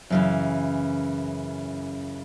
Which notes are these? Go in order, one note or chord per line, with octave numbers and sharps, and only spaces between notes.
F#2 C#3 E3